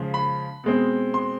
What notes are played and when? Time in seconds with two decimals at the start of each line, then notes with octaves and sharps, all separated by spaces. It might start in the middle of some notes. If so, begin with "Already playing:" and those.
Already playing: C#3 F3 G#3
0.14 B5
0.64 B2 G#3 C4
1.14 C6